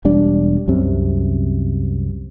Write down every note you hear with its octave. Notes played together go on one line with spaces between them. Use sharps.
E1 G3 D4
C2 F#2 C3